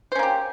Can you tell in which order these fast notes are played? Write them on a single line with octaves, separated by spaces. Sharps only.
C5 C#4 A#3 G4